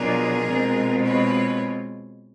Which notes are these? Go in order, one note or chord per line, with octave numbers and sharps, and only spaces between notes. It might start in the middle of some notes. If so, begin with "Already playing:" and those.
Already playing: B2 F#3 B3 D4 F4 G#4 A#4
B2 G#3 C4 F4
B4 C#5